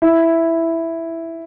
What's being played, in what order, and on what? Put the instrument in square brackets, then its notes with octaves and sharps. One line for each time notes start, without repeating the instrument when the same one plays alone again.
[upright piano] E4